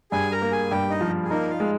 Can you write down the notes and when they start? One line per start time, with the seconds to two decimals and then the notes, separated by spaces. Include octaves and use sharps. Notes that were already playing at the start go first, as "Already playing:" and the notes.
0.11 G2 G#4 G#5
0.32 A#4 A#5
0.42 A#3
0.51 G#4 G#5
0.70 G2 G4 G5
0.90 D#4 D#5
1.01 F3
1.24 G#4
1.30 A#3 D#4 A#4
1.50 F4 F5
1.60 G#3